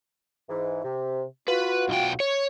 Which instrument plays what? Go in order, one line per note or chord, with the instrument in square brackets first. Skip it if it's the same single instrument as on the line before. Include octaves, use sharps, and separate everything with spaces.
[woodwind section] G#2 E3
C3
[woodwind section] F4 F#4 [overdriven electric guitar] B4
[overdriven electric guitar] B1 G5
C#5